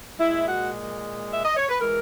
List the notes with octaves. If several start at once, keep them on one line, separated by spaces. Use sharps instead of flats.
A#2 G#3 E4
F#4
E5
D#5
C#5
B4
E3 G#3 A#4